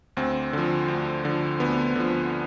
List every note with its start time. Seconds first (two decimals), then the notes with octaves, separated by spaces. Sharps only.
0.17 D2 C4
0.53 D3 F3
0.88 D2
1.24 D3 F3
1.60 D2 B3
1.95 D3 F3